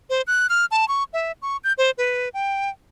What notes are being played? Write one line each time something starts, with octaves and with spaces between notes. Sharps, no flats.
C5
F#6
F6
A5
C#6
E5
C#6
G6
C5
B4
G5